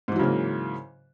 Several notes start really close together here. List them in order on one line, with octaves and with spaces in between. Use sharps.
G#2 E3 F#3 C#3 A#3